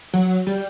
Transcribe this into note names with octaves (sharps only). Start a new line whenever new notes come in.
F#3
G3